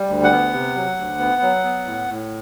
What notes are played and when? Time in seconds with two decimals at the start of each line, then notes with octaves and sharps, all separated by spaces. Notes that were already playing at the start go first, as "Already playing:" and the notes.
Already playing: G3
0.09 D2
0.24 F#5
0.31 B3
0.53 C3
0.75 F#3
0.97 D2
1.19 B3
1.42 F#3
1.64 B3
1.86 A2
2.08 A2